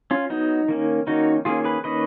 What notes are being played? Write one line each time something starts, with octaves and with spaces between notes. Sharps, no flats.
C#4 F4
F#3 B3 D#4
D#3 A#3 C#4
D#3 A#3 C#4 D#4 F#4
D#3 A#3 C#4 F4 G#4
G#4 B4
D#3 A#3 C#4 B4 D#5